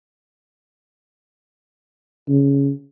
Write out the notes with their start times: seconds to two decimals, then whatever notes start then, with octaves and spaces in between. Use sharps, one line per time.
2.29 C#3